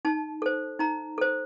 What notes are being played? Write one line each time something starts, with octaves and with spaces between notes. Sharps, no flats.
D#4 A5
A4 C5
D#4 A#5
A4 C5